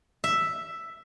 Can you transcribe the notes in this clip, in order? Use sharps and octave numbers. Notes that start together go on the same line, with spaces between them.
E5